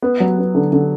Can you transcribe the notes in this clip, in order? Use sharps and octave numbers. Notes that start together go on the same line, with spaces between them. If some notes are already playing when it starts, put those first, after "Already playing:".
B3
F#3
B3
D3
D3